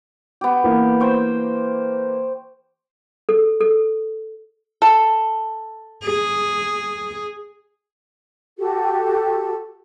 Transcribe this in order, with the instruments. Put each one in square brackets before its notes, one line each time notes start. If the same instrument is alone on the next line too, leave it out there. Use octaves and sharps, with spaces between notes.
[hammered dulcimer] B3 G4
[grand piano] E3 A#3
[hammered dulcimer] C5 G5 C#6
[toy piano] A4
A4
[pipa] A4
[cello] G#4
[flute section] F#4 G4 A4